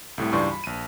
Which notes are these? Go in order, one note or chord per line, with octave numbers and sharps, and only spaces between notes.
C2 A2 C3
C#2 G2 E3 D5 C6 C#6
B5
A#1 D#7